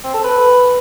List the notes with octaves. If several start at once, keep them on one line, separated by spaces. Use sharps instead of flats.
C4
A4
B4